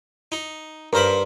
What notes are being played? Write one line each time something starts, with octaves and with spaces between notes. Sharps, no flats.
D#4
G2 A#4 C5 B5